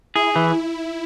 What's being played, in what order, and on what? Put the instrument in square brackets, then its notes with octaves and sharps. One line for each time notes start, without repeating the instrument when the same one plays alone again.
[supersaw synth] E4 [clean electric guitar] G#4
[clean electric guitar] E3